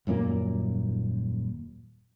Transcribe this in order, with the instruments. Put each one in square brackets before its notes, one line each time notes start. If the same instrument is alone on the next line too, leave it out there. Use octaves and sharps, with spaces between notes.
[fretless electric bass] D#1 F#2 A#2 A#3